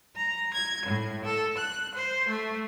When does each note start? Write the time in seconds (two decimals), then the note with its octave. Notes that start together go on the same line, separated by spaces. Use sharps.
0.16 A#5
0.55 G#6
0.86 A2
1.25 A4
1.57 F#6
1.94 C5
2.29 A3